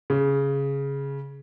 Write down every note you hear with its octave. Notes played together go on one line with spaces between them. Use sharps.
C#3